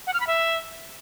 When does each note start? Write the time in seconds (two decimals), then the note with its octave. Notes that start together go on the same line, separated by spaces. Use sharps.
0.07 F#5
0.13 F6
0.20 B5
0.27 E5